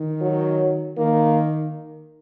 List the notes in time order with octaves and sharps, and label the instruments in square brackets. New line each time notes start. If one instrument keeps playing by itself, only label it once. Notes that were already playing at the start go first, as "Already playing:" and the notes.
Already playing: [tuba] D#3
[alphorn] F#3
[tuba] D#3 [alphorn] A#3